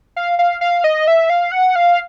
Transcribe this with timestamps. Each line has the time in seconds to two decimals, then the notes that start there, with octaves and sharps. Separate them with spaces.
0.16 F5
0.39 F5
0.61 F5
0.84 D#5
1.08 E5
1.30 F5
1.52 F#5
1.76 F5